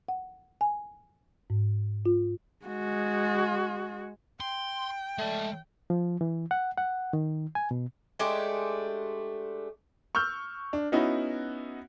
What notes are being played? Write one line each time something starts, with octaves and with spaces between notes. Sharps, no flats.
F#5
G#5
G#2
F4
G#3 F#4
G5 C6
G#3 A3 D5
F3
E3
F#5
F#5
D#3
G#5
B2
G#3 A3 D4 G4
C#6 E6 F6 G6
D4
B3 C#4 D#4 E4 F#4